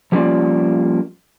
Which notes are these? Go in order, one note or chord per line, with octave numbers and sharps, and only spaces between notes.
F3 G3 A#3 C#4 F4 D5